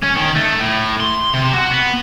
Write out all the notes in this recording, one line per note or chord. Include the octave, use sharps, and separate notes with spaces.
C#4
D#3
A3
A2
C6
C3
F#4
B3